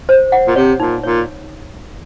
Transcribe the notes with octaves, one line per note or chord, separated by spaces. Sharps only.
C5
F#5
A#2
C3 C#5
A#2 D#4
A#2 C#5